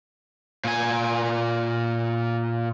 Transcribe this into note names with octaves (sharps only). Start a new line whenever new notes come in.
A#2 G#5